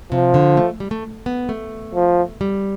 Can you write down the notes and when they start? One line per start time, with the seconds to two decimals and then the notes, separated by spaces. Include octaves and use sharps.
0.12 C3 F3
0.34 D3
0.57 A3
0.80 G3
0.91 A3
1.26 B3
1.49 A3
1.95 F3
2.41 G3